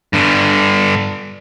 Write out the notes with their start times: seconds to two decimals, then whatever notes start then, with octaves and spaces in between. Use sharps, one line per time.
0.13 G2 D3